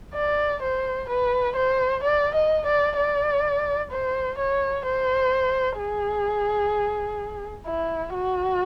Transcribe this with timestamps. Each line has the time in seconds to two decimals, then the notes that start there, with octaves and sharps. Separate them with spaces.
0.14 D5
0.62 C5
1.09 B4
1.56 C5
2.03 D5
2.34 D#5
2.66 D5
2.97 D5
3.91 C5
4.38 C#5
4.85 C5
5.79 G#4
7.67 E4
8.14 F#4